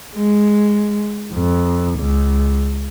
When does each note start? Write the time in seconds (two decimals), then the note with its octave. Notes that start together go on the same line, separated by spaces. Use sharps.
0.16 G#3
1.33 F2
1.99 C#2